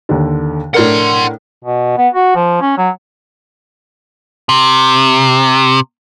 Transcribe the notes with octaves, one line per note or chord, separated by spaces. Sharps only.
D#2 D3
A2 D4 A#4 F#5 C6
B2
B3
F#4
F3
C#4
F#3
C3